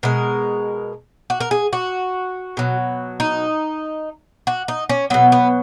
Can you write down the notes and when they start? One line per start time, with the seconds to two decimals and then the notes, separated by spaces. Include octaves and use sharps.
0.03 B2 G#3 A#4
1.30 F#4
1.40 A#4
1.51 G#4
1.73 F#4
2.57 B2 F#3
3.20 D#4
4.47 F#4
4.68 D#4
4.89 C#4
5.10 B2 F#3 B3
5.32 B3